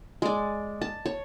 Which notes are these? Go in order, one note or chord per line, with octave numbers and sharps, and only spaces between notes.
G#3 D5
A5
C#5